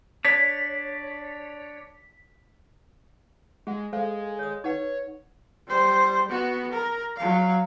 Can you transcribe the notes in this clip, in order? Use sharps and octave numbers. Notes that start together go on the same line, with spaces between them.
D4 C#5 B6
G#3 G#4 F#5
G#3 A4 C5 F5
C#5 D#6
D#4 B4 C#5 F#5
G3 C5
B3 F#4
A#4
F#3 F5